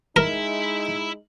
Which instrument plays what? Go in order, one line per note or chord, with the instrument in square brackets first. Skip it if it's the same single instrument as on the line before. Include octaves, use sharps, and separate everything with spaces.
[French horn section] G#3 D#4 [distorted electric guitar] E4 E5 [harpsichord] A#4